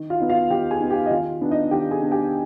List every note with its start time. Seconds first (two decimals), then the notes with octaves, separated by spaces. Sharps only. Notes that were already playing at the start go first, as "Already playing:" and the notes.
Already playing: D#3
0.10 F4 F5
0.20 B3 D#4
0.29 F4 F5
0.50 D#3 G4 G5
0.71 G#4 G#5
0.80 B3 D#4
0.90 G4 G5
1.06 D#5
1.11 D#3 F4 F5
1.41 B3 D4
1.51 D#4 D#5
1.71 D#3 G4 G5
1.91 G#4 G#5
2.01 B3 D4
2.11 G4 G5